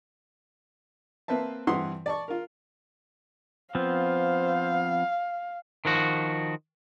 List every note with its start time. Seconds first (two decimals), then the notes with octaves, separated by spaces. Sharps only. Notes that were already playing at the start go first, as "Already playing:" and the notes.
1.28 A#3 C4 B4 C5 E5 A5
1.67 G2 E3 C4 F#5 C6 D#6
2.06 D5 A5 C#6
2.28 F4 A#4
3.75 F3 B3 C4 C5 F5
5.85 D#3 F3 F#4